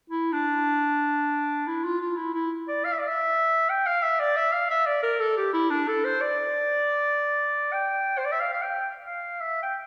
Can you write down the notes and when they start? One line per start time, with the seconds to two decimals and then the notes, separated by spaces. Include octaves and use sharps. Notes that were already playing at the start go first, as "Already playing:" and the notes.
0.10 E4
0.32 D4
1.67 E4
1.84 F4
2.01 F4
2.17 E4
2.34 E4
2.68 D5
2.85 F5
2.93 E5
2.99 D5
3.08 E5
3.69 G5
3.86 F5
4.03 E5
4.20 D5
4.37 E5
4.53 F5
4.70 E5
4.87 D5
5.03 A#4
5.20 A4
5.37 G4
5.53 E4
5.70 D4
5.88 A4
6.04 C5
6.21 D5
7.73 G5
8.18 C5
8.25 D5
8.32 E5
8.40 F5
8.53 F5
8.62 G5
9.07 F5
9.41 E5
9.63 G5